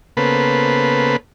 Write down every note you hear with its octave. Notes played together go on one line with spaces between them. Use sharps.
C#3 A#3 B3 A4 B4 C5